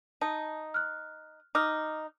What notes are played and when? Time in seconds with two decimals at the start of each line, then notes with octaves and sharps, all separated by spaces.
0.21 D#4 A5
0.74 F6 F#6
1.55 D#4 D6 E6 F6